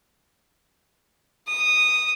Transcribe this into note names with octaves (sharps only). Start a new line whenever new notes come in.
D#6